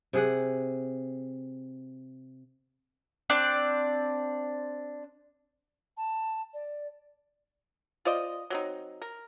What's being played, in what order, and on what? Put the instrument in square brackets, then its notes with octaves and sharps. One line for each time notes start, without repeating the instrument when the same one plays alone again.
[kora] C3 G#4 F#5
[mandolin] C4 D4 D5 F#6
[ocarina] A5
D5
[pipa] F4 C5 D5 D#5
F#3 C4 D#4
A#4